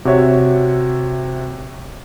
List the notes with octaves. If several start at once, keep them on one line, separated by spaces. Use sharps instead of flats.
C3 F#4 C#5 E5